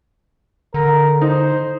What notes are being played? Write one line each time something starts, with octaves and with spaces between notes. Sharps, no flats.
D3 A#4
D#4 C5